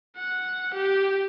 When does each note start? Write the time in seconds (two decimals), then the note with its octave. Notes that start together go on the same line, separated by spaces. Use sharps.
0.17 F#5
0.74 G4